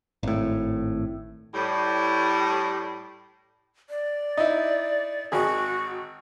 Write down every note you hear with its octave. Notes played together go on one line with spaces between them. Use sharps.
G#1 A2
A2 G3
D5
D#4 E4
G#1 F#4 G#4